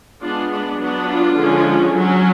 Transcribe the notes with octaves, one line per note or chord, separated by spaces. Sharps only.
G#3 B3 D4 F4
D4
F#3 B3 D4
F4
D3 F3 G#3 C#4
F#3 C#4